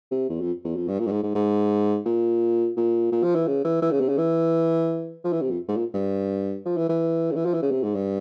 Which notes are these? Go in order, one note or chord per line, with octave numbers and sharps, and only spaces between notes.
C3
E2
F2
E2
F2
G2
A#2
G2
G#2
G#2
G#2
A#2
A#2
A#2
F3
E3
C#3
E3
E3
C#3
C3
C#3
E3
F3
E3
C3
F2
G#2
A#2
G2
F3
E3
E3
C#3
E3
F3
E3
C#3
C3
G#2
G2